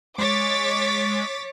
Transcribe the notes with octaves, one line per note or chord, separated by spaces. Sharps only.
G#3 C#5 D6 A6 B6